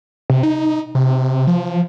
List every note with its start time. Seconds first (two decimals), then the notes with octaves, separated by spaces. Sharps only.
0.30 C3
0.43 D#4
0.95 C3
1.47 F3